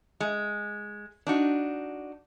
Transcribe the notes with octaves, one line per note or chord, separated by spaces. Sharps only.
G#3
D4 D#4 F#4